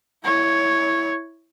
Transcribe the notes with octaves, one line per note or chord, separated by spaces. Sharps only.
E4 C#5